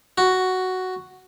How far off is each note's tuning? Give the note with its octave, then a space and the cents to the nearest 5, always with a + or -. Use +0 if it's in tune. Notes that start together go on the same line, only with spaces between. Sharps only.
F#4 +5